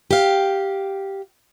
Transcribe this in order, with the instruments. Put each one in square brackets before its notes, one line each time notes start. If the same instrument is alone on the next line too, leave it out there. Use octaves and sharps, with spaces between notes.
[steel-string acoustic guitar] G4 F5